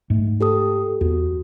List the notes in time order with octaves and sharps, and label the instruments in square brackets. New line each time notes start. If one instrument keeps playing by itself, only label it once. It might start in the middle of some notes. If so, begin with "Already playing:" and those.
[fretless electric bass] G#2 A3
[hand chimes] G4 A4 D#6
[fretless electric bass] E2 [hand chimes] F#4